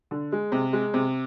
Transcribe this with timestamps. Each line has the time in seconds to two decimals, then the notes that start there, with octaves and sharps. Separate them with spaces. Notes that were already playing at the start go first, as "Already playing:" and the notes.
0.11 D3
0.32 G#3
0.52 C3
0.73 G#3
0.94 C3